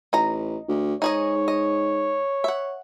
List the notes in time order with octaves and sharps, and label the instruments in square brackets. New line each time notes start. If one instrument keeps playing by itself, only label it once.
[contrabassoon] A1 [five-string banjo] D#4 A#5
[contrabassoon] D2
[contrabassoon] G#2 [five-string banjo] D#4 G#4 D#5 [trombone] C#5
[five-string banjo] D#5
E5 F#5